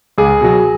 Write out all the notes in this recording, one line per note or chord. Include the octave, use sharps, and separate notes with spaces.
C#2 G#4
B2 F#3